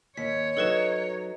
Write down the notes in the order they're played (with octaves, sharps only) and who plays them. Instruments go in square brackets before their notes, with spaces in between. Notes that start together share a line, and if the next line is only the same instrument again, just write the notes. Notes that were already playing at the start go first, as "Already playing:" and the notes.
[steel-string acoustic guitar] D#2 [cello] C#5 [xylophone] B6
[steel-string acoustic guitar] F#3 D#4 [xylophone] A4 B4 E7